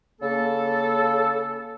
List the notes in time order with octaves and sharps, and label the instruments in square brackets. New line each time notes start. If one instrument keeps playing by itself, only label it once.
[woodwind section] C#3 A#3 A4